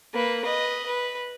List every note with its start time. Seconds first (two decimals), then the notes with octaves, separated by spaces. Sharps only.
0.14 A#3 B4
0.44 B4 D#5
0.87 B4